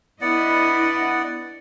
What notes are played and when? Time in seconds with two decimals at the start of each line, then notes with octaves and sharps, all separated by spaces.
0.21 B3 D4 E4 D5 D#5 F#5